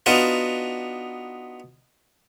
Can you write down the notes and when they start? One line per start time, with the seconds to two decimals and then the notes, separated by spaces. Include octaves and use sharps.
0.06 B3 D4 D#4 F4 F#4 D5